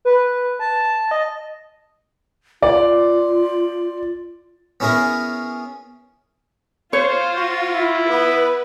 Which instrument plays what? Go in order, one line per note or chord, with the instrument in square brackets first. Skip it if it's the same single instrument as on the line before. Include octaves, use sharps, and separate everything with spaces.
[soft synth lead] B4
A5
D#5
[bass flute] F4 [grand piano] D5
[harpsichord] B3 C#4 E4 G#4 A#4
[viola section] F4 [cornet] C5 [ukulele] C#5
[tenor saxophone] F#4
[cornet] E4
[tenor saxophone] B3 [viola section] B4